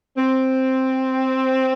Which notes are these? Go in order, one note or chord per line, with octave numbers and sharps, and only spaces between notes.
C4